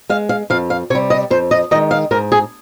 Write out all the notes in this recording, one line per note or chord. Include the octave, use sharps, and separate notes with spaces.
G#3 F5
F5
F2 F5
F5
C3 G3 C#5
D#5
F2 C5
D#5
D#3 G#3 D#5
F5
G#2 A#4
G#4